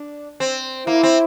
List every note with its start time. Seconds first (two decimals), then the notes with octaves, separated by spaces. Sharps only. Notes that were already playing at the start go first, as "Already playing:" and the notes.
Already playing: D4
0.40 C4
0.87 A#3 E4
1.03 C4